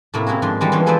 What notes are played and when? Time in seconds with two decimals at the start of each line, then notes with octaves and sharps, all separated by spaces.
0.14 A2 C3 A3 A#3 E4
0.27 C4 C#4 E4 F#4 G#4
0.42 G#2 F3 D4 D#4 C6
0.60 E3 G3 G#3 D4
0.72 E3 F3 B3 C#4 F4
0.86 G#4 A4 B4 C5 D5 G#5